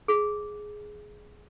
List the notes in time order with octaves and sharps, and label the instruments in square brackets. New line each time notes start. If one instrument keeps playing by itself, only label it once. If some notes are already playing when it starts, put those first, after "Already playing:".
[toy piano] G#4